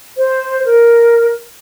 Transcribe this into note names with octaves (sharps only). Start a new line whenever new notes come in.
C5
A#4